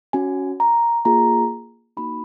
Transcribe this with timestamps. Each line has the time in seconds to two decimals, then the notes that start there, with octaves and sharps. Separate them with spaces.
0.13 C#4 F#4 G#5
0.60 A#5
1.05 A#3 F4 G#4 A#5
1.97 A#3 D#4 F#4 B5